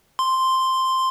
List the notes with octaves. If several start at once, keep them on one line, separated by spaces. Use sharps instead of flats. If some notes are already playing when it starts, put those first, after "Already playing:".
C6